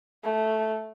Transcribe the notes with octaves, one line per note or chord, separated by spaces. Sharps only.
A3